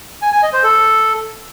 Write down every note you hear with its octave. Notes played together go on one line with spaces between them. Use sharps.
G#5
G#5
D#5
C5
A4